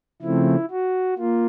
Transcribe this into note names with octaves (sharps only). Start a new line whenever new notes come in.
C#3 F3 A3 C4 E4
F#4
A#3 F4